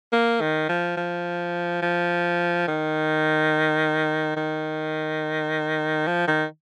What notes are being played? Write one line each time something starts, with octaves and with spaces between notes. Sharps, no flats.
A#3
D#3
F3
F3
F3
D#3
D#3
F3
D#3